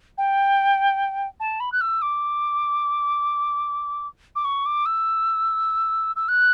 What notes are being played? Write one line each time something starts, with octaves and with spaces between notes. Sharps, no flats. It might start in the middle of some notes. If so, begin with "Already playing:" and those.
G5
A5
B5
F#6
E6
D6
D6
C#6
D6
E6
E6
F#6